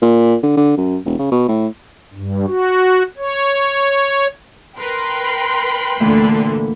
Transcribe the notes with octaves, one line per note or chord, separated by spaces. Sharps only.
A#2
D3
D3
F#2
E1
C#3
B2
A2
G2
F#4
C#5
A#4 B4 G5 B5 C6
D2 A#2 D3 E3 A3